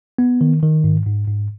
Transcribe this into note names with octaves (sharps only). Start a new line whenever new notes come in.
B3
D#3
D#3
G#2
G#2
G#2